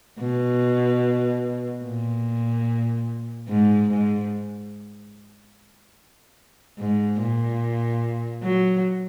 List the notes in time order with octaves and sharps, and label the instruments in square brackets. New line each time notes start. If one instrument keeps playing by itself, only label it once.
[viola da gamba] B2
A#2
G#2
G#2
G#2
A#2
F#3